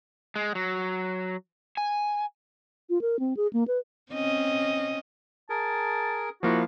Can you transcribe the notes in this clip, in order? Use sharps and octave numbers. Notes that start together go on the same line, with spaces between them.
G#3
F#3
G#5
F4
A#4
C4
G#4
A#3
B4
C4 C#4 D#5
G#4 A#4 A5
F3 A#3 E4 F#4 F5